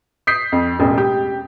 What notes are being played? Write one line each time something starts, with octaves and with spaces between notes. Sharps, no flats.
D#6 G6 B6 C7
F2
E1 A1
G4